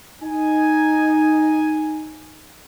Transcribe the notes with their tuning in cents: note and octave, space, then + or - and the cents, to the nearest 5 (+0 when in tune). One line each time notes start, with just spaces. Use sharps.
D#4 +0 G#5 +0